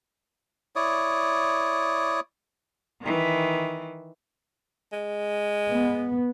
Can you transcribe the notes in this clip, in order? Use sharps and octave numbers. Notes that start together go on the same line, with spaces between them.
E4 C#5 D5 D#6
D#3 E3
G#3
B3